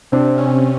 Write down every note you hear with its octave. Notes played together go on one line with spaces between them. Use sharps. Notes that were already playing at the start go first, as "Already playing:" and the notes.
C3 C4 D4
C#4